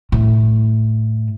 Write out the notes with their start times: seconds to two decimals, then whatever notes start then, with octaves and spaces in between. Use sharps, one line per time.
0.12 A2